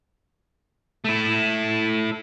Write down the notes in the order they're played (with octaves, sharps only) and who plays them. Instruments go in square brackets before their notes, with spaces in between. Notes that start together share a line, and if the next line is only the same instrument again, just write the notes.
[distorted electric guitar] A3 E4